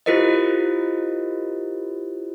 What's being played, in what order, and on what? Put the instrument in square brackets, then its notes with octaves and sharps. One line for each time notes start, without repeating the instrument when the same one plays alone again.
[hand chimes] E4 F4 G4 A#4 C5 D#5